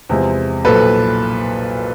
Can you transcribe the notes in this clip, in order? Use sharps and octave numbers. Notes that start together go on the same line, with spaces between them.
E2 C3 F3 G#3
B1 A#2 F3 A4 B4